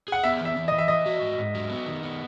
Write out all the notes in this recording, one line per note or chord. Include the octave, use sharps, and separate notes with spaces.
G#4 F#5
B3 E5
E3 E5
E3
E3 D#5
E5
E3 D#5
F#4
G#2
G#2
F#3
B3
D#3
B3